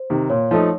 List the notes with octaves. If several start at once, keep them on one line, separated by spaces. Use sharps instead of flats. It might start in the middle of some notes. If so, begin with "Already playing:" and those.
Already playing: C5
C3 D#3
A#2 C#5
F3 A3 D#4